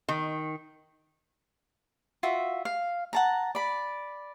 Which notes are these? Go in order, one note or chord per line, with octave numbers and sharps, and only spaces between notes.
D#3
F4 F#4 E5
F5
F#5 A5 A#5
D5 B5